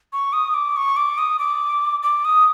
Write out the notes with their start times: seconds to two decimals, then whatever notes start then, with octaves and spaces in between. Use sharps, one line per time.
0.13 C#6
0.33 D#6
0.54 D6
0.76 C#6
0.96 D6
1.18 D#6
1.39 D6
2.03 D6
2.25 D#6